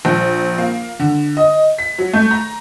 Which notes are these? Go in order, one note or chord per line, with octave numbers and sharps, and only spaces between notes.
A#1
A#3
D3
D#5
B6
F#3
A3
A#5